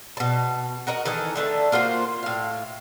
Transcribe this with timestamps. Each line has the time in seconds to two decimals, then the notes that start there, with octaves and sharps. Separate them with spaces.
0.17 B2 A5
0.87 F#4 A#4 D#5 F#5
1.05 D#3 E3 A4 D#5
1.36 D3 A3 E5 A5
1.72 A#3 F4 F#4 C5
2.23 A2 F5